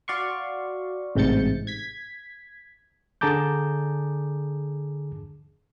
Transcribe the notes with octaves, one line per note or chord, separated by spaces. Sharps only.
F#4 D5 F5 C6 C#6
A1 G#2 C3 G6 A6 C#7
G#6 B6
D3 G#4 A5 A#5 D6 G6